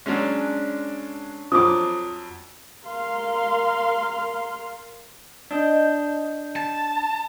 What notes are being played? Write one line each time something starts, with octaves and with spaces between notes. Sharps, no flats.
F#3 G#3 C#4 D4
F2 F3 F#3 D6 D#6
A#4 F5 C6
D4 D#5 G6
A5